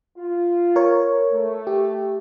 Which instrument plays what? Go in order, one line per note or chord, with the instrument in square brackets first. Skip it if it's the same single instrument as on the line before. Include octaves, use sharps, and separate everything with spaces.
[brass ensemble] F4
[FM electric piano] A#4 C#5
[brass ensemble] A3
[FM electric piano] G4